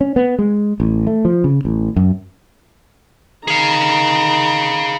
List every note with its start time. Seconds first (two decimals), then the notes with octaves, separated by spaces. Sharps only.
0.01 C#4
0.16 B3
0.39 G#3
0.80 A1
1.07 A3
1.25 F3
1.44 C#3
1.65 A1
1.96 F#2
3.48 D#3 G#4 F5 A#5